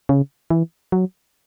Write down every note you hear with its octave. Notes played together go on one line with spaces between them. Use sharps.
C#3
E3
F#3